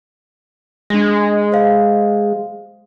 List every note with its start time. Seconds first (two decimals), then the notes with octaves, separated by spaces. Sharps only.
0.90 G#3 D4 A#6
1.52 C5 F5